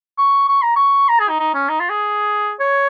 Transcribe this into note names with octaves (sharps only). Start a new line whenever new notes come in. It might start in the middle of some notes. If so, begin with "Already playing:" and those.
C#6
C#6
A#5
C#6
A#5
G#4
D#4
D#4
C#4
D#4
F4
G#4
C#5